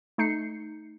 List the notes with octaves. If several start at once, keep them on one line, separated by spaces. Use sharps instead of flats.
A3 D#4 G6 C7 C#7